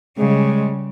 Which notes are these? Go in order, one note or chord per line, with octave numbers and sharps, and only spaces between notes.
C#3 G3 G#3